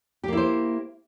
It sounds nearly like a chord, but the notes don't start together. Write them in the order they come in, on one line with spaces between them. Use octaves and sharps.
G4 A#3 E4 C5